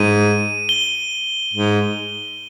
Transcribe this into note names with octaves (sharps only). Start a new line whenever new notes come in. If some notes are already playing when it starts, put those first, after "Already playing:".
Already playing: G#2 D#7
G7
G#2